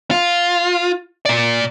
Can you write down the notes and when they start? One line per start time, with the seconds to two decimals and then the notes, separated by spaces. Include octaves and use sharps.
0.11 F4
1.26 A#2 D5